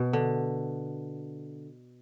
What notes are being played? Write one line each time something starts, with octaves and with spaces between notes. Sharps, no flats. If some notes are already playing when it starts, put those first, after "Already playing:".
Already playing: B2
D3